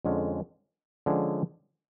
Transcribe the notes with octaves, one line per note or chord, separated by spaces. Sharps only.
F2 D3 G#3 C#4
D3 F3 G#3 C#4 G#4